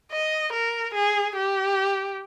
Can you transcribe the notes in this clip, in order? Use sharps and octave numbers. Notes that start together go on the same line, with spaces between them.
D#5
A#4
G#4
G4